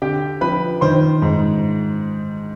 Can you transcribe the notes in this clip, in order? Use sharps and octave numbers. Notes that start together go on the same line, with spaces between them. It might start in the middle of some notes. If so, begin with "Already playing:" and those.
D3 G4 G5
F3 B4 B5
D#3 C5 C6
G#2